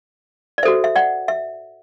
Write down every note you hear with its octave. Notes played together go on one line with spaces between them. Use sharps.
D5
F#4 A4 C5 E5
E5
D5 F#5
E5